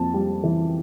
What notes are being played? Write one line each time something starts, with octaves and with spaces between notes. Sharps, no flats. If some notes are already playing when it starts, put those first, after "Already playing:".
Already playing: F2 A#3 A5
G3
E3